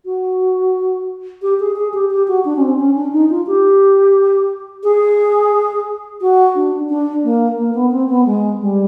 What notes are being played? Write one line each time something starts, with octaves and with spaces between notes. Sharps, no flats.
F#4
G4
G#4
G#4
G4
G4
F#4
D4
C#4
C4
C#4
D4
D#4
F4
G4
G#4
F#4
D4
D4
A#3
A#3
B3
C4
B3
G#3
G3